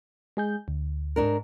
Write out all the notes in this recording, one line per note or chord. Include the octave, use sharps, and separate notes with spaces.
G#3 G#4 G6
D2
G#2 D4 A#4